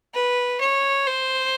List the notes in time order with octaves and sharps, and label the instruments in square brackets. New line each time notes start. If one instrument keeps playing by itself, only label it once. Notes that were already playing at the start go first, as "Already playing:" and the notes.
[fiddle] B4
C#5
C5